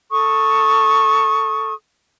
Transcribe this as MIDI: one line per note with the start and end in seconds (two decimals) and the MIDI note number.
0.12 1.73 69
0.12 1.73 85
0.12 1.73 87